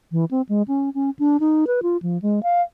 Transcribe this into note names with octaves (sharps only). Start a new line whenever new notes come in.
E3
C4
G#3
C#4
C#4
D4
D#4
B4
F4
F3
G#3
F5